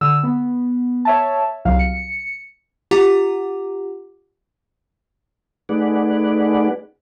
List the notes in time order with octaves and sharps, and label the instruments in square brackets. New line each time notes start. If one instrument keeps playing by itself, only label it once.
[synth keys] D3 E6
B3
C#5 E5 A5
C2 F#3 F5
C#7
[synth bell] F4 G4 F#5 A#5 D6
[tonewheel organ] A3 D#4 G#4 B4 D5 F#5